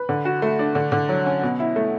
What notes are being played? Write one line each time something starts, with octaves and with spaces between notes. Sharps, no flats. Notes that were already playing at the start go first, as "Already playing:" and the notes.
Already playing: B4
D3
F#4
A3
D4
D3
D3
F#3
C#4
B2
E4
A3